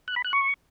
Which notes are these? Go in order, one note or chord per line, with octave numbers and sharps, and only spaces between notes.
F#6
B5
F#6
C#6